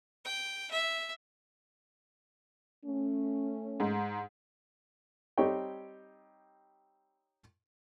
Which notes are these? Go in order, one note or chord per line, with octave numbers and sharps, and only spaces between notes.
G5
E5
A3 C#4
G#2 G#3
G3 C4 D#4 G4 C#5 G5